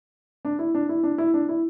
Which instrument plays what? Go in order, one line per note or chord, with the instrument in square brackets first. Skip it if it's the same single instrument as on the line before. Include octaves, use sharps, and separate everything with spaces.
[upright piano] D4
E4
D4
E4
D4
E4
D4
E4